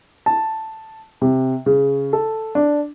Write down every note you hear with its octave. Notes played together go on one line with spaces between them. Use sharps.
A5
C3
C#3
A4
D4